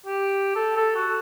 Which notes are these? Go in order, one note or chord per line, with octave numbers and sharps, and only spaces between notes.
G4
A4
A4
F#4